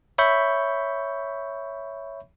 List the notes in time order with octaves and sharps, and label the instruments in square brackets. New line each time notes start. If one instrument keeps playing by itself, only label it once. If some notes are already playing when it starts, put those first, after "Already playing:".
[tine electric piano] C#5 E5 B5 C#6 G6